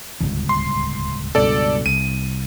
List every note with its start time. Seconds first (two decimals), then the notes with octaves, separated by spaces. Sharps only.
0.20 D1 G1 C#2
0.49 C6
1.35 C#2 G2 B2 A4 D5
1.86 C2 D#7